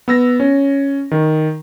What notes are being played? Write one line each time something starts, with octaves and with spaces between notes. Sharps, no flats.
B3 E6 A#6
C#4
D#3